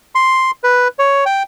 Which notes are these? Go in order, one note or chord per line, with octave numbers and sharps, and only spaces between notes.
C6
B4
C#5
G5